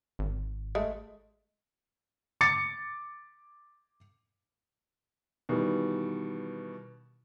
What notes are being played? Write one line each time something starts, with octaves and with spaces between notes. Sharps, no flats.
G#1
G#3 A3
D6 A6 C#7
B2 D#3 E3 G3